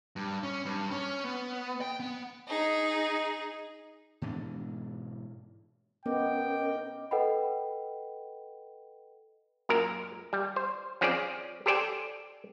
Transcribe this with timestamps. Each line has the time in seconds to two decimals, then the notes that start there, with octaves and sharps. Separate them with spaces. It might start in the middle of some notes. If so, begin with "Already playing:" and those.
0.16 G2
0.43 C#4
0.65 G2
0.91 C#4
1.25 B3
1.81 G5
2.00 B3
2.47 D#4 G#4
4.22 G#2 B2 E3 D4
6.06 B3 C#4 A#4 D#5 G5 D6
7.11 A4 B4 D#5 F#5 G5 B5
9.69 F#2 A#2 A#3 A#4 A#5
10.33 G3
10.56 C5
11.01 F3 C4 C#4 G#4 D5
11.66 G4 A4 C5 D5 G5 G#5